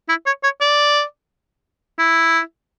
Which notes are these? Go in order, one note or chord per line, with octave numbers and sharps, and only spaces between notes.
E4
C#5
C#5
D5
E4